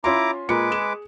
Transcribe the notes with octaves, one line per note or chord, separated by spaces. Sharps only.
C#4 E4 F4 A#5 C6 D6
A#2 G#3 A#3 B4 D6 C#7
G#4 E7